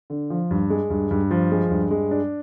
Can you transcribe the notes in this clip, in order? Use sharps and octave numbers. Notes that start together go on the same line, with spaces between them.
D3
F3
G2
G#3
G2
G2
F3
G#3
G2
G#3
D4